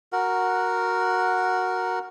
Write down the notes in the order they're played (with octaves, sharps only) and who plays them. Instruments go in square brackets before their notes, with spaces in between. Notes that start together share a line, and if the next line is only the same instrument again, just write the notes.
[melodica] F#4 A#4 F#5